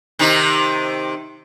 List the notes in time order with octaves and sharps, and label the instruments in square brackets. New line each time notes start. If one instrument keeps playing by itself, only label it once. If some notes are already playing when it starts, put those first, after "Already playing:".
[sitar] C3 D#3 D#4